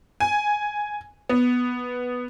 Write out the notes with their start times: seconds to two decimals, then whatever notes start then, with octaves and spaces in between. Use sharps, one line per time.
0.20 G#5
1.29 B3